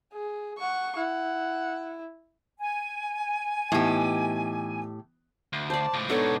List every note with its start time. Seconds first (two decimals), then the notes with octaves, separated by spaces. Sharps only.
0.13 G#4
0.58 F#5 C#6
0.97 E4 F#5
2.58 G#5
3.72 A2 E3 B3 D#4 G4
5.53 D2
5.70 C5 D5 A5
5.94 C#2 A2
6.09 G#2 B2 B3 D4 D#4 A4 C#5